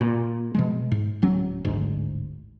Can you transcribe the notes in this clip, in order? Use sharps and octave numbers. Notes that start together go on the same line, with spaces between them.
A#2
B2 F3 G#3
G#2
D1 F#3 C#4
D1 G#1 D2 G#2